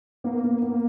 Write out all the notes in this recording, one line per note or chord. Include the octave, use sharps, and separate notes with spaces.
A#3 B3
B3
B3